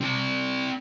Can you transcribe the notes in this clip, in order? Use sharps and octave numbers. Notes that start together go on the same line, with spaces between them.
C4 D5